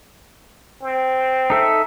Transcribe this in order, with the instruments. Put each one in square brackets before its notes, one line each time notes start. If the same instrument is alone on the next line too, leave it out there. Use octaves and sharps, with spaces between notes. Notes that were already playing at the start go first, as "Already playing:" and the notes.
[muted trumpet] C4
[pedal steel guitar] D#4 A4 E5